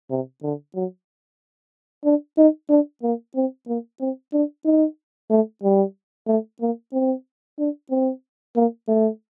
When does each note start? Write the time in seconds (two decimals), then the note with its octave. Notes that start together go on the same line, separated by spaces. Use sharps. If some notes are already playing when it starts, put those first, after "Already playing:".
0.10 C3
0.43 D3
0.75 F#3
2.04 D4
2.38 D#4
2.69 D4
3.03 A#3
3.36 C4
3.67 A#3
4.00 C4
4.33 D4
4.65 D#4
5.30 A3
5.63 G3
6.27 A3
6.61 A#3
6.93 C4
7.59 D4
7.90 C4
8.56 A#3
8.88 A3